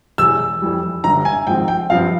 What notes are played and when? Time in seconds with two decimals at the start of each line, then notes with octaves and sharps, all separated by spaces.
0.18 E1 E2 E3 E6
0.62 F2 E3 G3
1.04 G1 G2 G3 A#5
1.25 G#5
1.47 G#1 G#2 F3 C4 G5
1.68 G5
1.90 G2 F3 C4 F5